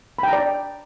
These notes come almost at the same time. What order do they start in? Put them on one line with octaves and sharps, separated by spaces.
B5 G5 A#5 D5